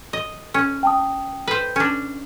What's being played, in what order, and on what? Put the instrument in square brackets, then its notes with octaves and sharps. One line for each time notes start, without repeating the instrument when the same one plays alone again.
[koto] D#5
C#4
[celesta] G5 A5 D#6
[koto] B4 C5
C#4 D4